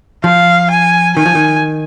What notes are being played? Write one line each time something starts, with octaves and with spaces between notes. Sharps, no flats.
F3 F5
G#5
D#3 G#5
F3
D#3